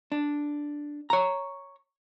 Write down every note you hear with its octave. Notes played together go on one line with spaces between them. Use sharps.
D4
C#5 A#5